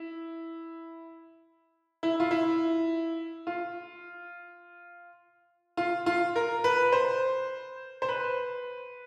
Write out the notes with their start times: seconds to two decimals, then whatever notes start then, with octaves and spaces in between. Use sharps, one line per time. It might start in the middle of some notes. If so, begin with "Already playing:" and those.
Already playing: E4
2.03 E4
2.20 F4
2.31 E4
3.47 F4
5.77 F4
6.06 F4
6.36 A#4
6.64 B4
6.92 C5
8.02 C5
8.09 B4